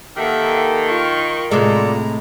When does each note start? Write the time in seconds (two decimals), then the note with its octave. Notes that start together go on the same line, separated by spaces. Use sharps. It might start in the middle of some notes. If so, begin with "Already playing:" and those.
0.17 D#3 A#3 G4 A4 E5 F#5
0.87 F4 C#6
1.51 A2 C3 G#3 F4 A4 D5 A#5